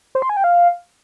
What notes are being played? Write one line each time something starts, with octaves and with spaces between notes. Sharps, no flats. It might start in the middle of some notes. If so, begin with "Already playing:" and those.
C5
C6
G#5
G5
F5